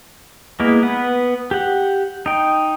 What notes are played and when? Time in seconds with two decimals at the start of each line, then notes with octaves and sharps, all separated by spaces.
0.60 G#3 A#3 B3 E4 A#4
0.83 B3 B4 F#5
1.51 G4 F#5
2.26 D#4 G5